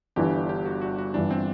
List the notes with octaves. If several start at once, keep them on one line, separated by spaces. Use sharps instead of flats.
G1 G2 E3 G4
G4
F#4
F#4
F#4
G1 G2 E3 D4
C4